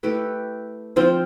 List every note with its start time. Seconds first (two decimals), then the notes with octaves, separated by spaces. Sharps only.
0.03 A3 E4 G4 B4
0.96 F3 C4 F4